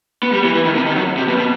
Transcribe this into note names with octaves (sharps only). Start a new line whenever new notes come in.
B3
G3
E3
E3
D#3
C3
D#3
F#3
C3
B2
B2